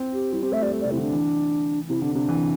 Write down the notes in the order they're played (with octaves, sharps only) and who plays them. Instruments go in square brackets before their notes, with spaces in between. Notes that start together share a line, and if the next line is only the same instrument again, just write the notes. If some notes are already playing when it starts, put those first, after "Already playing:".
Already playing: [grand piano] C4
[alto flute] G4
[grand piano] G3 [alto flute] E4
[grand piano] C4 [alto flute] G4
[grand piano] A3 [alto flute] E5
[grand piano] G3 [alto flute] D5
[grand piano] A3
[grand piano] C3 [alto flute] D5
[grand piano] C3 [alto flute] E4
[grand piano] D3 [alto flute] D4
[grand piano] E3
[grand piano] C3 [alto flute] E4
[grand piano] D3 [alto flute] D4
[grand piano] C3 [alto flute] D4
[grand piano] E3